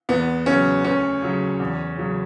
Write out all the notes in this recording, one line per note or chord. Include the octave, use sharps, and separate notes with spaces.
E2 B3
C#3 F#3 C#4
D2 C#4
C#3 F#3
E2
C#3 F#3